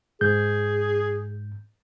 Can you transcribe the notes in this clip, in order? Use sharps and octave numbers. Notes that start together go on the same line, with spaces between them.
G#2 G#4 G6